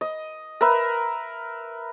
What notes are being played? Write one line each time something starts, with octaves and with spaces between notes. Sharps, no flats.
D#5
A#4 B4 E5